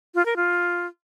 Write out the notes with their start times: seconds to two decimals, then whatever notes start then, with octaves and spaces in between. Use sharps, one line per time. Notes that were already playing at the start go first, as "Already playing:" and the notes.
0.15 F4
0.26 A#4
0.36 F4